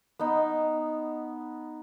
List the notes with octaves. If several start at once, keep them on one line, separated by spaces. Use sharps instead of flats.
B3 D#4